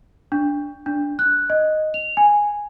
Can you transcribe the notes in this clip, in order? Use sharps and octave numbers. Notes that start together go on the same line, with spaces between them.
D4
D4
F#6
D#5
F7
G#5